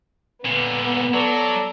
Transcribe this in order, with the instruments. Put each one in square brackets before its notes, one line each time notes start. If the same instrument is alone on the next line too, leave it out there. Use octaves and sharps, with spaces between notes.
[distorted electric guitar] A#2 D3 [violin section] B3
[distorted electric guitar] F#3 [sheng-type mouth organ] A4 D5 A#5